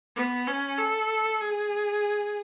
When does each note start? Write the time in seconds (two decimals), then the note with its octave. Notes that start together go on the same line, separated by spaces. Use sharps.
0.16 B3
0.47 C#4
0.78 A4
1.41 G#4